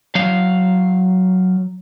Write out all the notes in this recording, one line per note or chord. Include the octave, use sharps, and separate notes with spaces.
F#3 F5